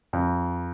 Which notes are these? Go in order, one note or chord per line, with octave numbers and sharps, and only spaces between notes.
F2